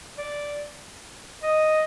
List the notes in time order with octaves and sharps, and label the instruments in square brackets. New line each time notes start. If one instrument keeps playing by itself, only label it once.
[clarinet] D5
D#5